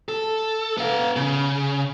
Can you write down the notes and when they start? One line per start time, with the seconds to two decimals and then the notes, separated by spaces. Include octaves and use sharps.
0.09 A4
0.77 B3 F5
1.16 C#3